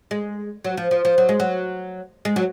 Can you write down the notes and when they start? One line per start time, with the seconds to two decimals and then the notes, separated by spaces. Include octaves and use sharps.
0.11 G#3
0.65 F#3
0.77 F3
0.91 F3
1.05 F3
1.18 F#3
1.29 G#3
1.40 F#3
2.25 G#3
2.36 F#3